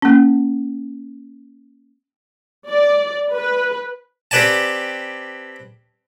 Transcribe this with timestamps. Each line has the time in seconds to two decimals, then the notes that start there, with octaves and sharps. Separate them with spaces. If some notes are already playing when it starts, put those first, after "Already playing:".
0.02 A#3 C#4
2.68 D5
3.33 B4
4.31 C4 G4 B4 D5 G#5 A5